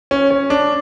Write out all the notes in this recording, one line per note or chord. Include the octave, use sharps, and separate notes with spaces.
C#4
C#4
D4